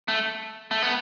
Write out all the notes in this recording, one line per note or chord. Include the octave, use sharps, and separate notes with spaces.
A3
A3
B3